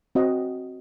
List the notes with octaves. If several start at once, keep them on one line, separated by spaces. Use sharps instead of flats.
C4 F#4 D#5 F#5